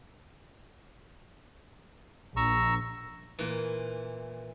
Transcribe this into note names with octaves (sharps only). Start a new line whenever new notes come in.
A#1 A#5 C#6 E6
A#2 E3